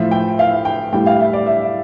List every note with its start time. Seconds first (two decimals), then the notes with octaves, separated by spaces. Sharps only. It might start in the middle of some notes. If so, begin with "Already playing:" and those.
Already playing: A2 F3 E5
0.11 G5
0.39 F5
0.65 G5
0.92 A2 G3 G5
1.06 F5
1.19 E5
1.33 D5
1.46 E5